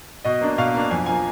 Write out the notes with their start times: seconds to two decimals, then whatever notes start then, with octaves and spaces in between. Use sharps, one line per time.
0.24 B2 D#5
0.41 A#3 D4
0.58 B2 F5
0.74 A#3 D4
0.91 F2 G#5
1.06 F3 A#3 G#5